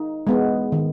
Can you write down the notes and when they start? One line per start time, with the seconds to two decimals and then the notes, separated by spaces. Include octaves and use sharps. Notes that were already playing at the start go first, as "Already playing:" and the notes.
Already playing: D#4
0.27 G#3 B3
0.72 D#3